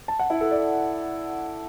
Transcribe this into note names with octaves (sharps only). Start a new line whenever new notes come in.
A5
F#5
E4
A4
D5